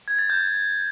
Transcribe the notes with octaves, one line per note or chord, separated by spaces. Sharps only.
G#6
A6
G6